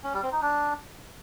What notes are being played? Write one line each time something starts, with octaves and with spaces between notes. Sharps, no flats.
C#4
G3
C4
D#4
D4